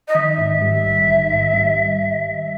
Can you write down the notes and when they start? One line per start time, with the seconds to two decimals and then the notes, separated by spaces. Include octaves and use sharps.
0.08 D#5
0.15 D#3 E5
0.38 G#2
0.61 G3
0.84 A#1
1.08 D#3
1.30 G#2
1.54 G3